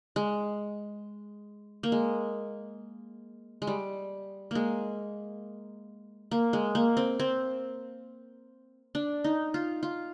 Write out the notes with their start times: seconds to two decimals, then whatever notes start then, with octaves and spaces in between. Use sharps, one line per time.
0.16 G#3
1.83 A#3
1.92 G#3
3.62 G#3
3.67 G3
4.51 G#3 A#3
6.31 A#3
6.53 G#3
6.75 A#3
6.97 C4
7.20 C4
8.95 D4
9.24 D#4
9.54 F4
9.83 F4